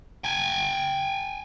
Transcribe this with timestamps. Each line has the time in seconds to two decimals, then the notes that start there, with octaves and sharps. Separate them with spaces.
0.24 G5 G#5